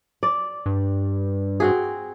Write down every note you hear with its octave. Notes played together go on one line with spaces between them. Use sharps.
D5
G2
C4 F#4 G#4